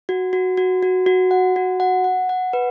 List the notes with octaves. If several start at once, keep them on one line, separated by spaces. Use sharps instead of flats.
F#4
F#4
F#4
F#4
F#4
F#5
F#4
F#5
F#5
F#5
B4